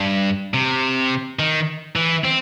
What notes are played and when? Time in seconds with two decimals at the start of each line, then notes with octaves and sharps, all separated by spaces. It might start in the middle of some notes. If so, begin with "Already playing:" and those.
Already playing: G2
0.54 C3
1.39 D#3
1.96 E3
2.24 C4